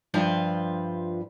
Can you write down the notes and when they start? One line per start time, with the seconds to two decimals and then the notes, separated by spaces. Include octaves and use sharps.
0.14 G2 F3 F4 B4 E5